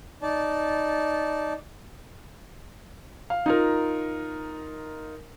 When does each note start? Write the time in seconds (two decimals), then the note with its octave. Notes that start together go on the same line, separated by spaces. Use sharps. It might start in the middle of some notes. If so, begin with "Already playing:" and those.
0.22 D#4 D5 A5
3.30 F5
3.46 D#4 F4 A#4